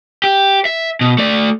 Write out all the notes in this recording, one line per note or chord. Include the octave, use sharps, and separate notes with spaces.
G4
E5
B2
A3 D5